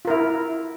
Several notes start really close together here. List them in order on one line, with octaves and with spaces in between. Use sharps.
F4 A#4 E4